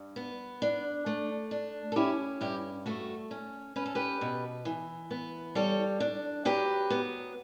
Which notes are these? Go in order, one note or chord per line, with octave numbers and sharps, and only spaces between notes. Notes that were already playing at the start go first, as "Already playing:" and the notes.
Already playing: G2
B3
D4
A3
D4
A4
C#4 E4 G4
G2 E4 G4
A3 F#4 A4
C#4
C#4 B4
A4
G4 B4
B2
E3
B3
G3 A4 C#5
D4
F#3 G4 B4
B3